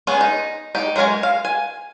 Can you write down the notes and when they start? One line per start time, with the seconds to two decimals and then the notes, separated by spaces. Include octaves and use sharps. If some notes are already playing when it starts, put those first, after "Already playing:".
0.07 B3 C#4 G#4
0.21 D#4
0.75 D#4 G4
0.96 F#3 G#3 A#4 C#5 G#5
1.23 F5
1.45 G#5